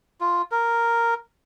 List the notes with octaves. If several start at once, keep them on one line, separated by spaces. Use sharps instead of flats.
F4
A#4